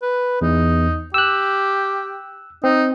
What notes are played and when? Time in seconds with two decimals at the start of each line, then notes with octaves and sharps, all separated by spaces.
0.02 B4
0.42 E2 D#4
1.14 G4 E6 F#6
2.64 C4 D#4